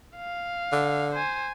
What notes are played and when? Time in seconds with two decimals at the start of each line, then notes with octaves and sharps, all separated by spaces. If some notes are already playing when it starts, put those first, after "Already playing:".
0.16 F5
0.72 D3
1.13 C5 G#5